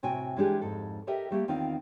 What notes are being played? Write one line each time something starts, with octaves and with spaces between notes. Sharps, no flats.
A2 C3 F#4 G5 G#5
E3 G#3 D4 G4 G#4
F2 G#2 A4
G4 A4 A#4 D#5 E5 G5
G3 A3 A#3 G4
E2 D#3 C4 D#4 F4 F5